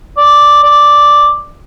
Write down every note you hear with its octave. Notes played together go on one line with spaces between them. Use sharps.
D5
D5